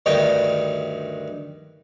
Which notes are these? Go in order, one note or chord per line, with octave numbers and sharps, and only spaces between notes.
D2 G2 D#3 D#4 G5